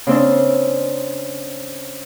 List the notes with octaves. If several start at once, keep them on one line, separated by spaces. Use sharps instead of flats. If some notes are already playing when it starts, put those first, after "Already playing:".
C#3 C4 D4